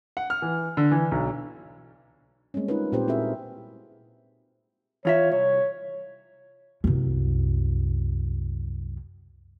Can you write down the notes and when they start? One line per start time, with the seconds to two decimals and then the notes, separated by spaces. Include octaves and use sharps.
0.17 F#5
0.30 F6
0.42 E3
0.77 D3
0.91 E3
1.11 B1
2.54 G3 G#3 A#3 C4 C#4
2.68 D#4 F4 A#4 B4
2.92 A#2 C4 G4 B4 C5
3.08 C4 E4 F#4 G#4 A#4 E5
5.05 E2 F4 C#5 E5
5.32 C2 C#5
6.84 C2 F#2